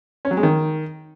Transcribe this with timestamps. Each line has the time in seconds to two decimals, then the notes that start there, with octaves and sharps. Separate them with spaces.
0.25 C#4
0.31 F#3
0.37 G#3
0.43 D#3